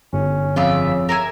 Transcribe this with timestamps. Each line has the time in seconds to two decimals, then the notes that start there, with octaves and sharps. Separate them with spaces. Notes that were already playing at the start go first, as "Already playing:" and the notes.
0.13 G1 C#4
0.56 F2 C#3 F4 D5 E5
1.09 C#3 A#4 E5 G#5